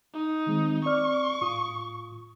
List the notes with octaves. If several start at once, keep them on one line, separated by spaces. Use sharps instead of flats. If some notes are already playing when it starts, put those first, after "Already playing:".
D#4
D#3 G#3 C4
C4 D5 C#6 F6
A2 F4 D#6